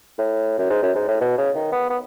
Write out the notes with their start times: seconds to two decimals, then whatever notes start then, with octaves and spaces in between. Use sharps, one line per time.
0.18 A2
0.58 F#2
0.70 G#2
0.83 F#2
0.95 G#2
1.08 A2
1.21 B2
1.38 C#3
1.55 D#3
1.72 B3
1.90 B3